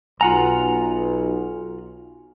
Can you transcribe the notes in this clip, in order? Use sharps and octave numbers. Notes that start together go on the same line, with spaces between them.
B1 F4 F#5 G#5 A#5